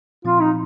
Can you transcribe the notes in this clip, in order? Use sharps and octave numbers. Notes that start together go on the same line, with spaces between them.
A#2 F3 C4 F4
D#4